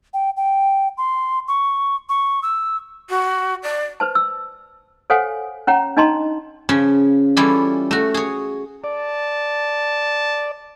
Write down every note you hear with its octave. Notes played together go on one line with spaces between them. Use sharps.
G5
G5
C6
C#6
C#6
E6
F#4
D5
B4 C5 A5
E6
A4 C5 C#5 F5 F#5 G#5
C#4 C#5 F#5 A#5
D4 D#4 D#5 A5 A#5 C6
C#3 F3 C#4
E3 G3 C#4 E4 F4 A4
A3 F#4
G#4 C#5
D5 A5